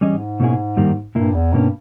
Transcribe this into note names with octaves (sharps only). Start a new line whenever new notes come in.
G#2 E3 G3 C#4 G#4 D#5
B2 A#3 C#4 E4 G#4
G2 D#3 G3 A#3
G2 A#2 A#3 E4
E2
G2 B2 A#3 C#4